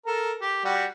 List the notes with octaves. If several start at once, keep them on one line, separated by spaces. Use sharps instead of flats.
A4 A#4
G4
G3 F#4